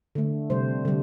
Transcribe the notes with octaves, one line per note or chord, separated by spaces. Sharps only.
D3 A3
C3 G3 C5
D3 G3